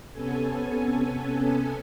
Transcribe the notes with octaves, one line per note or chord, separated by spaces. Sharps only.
C3 B3 C#4 A4 G#5